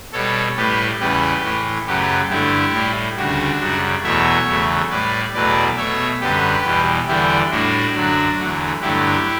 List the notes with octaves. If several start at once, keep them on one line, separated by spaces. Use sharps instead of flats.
B2 G3 A4 C#5
A2 G3 G4 B4
E2 C#3 G3 G4 B4
A2 E3 A3
F#2 C#3 F#3 A3 G4 B4
G2 D3 A3 E4 G4
A2 G3
D2 C#3 G3 D4 F#4
F#2 C#3 G3
E2 B2 F#3 A3 C#5 E5
E2 C#3 F#3 A3
A2 G3 B4 D5
E2 B2 F#3 A3 B4 D5
B2 A3 C#5 E5
F#2 D3 G3 G4 B4
E2 B2 G3
E2 D3 G3 E4 G4
A2 G3 D4 F#4
F#2 D3 F#3
E2 D3 F#3 A3
G2 D3 F#3 A3 E4 G4